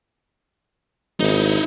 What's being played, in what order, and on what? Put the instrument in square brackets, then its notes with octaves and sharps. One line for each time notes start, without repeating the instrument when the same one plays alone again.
[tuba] G#1 [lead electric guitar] D#4 E4